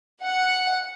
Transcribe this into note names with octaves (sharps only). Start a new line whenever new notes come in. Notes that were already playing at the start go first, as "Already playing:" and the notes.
F#5